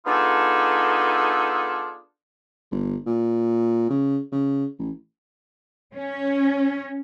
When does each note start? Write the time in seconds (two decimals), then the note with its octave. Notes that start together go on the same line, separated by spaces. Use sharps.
0.07 B3 D4 D#4 F4 G#4 A4
2.71 G1
3.06 A#2
3.90 C#3
4.32 C#3
4.79 A1
5.95 C#4